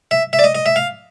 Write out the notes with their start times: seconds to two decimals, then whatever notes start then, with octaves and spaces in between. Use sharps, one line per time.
0.11 E5
0.33 E5
0.39 D5
0.44 D#5
0.55 D#5
0.66 E5
0.76 F5